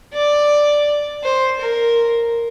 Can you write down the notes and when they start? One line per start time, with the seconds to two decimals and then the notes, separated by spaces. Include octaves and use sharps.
0.14 D5
1.24 C5
1.60 A#4